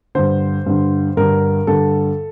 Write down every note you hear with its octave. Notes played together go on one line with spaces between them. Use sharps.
G2 D3 C5
G2 D3
G2 D3 A#4
G2 D3 A4